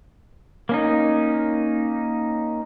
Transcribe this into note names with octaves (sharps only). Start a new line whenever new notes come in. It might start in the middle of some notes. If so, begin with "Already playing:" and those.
A#3 C#4 D#4